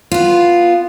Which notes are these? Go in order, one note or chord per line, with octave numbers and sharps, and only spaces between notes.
B3 F4